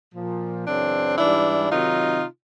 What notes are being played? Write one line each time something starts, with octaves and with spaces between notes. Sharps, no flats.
A#2 F3
F#2 C#3 E3 C4 D4
G#2 E3 G3 D4 E4
C3 D#3 F#3 D#4 F4